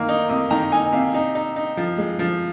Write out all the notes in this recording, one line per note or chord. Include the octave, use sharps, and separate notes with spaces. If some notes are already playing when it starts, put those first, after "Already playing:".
Already playing: D#3 A#3 F6
D#4
C3 D#6
D#3 A#5
D#4 G#5
C3 F5
D#4
D#4
D#4
F3
G#3
F3